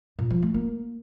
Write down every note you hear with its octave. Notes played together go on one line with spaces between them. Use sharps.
A#2
F3
A3
A#3